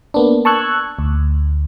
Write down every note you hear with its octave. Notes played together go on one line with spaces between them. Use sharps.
A#3 B3 D4
A5 C#6 E6 F#6 G#6
D2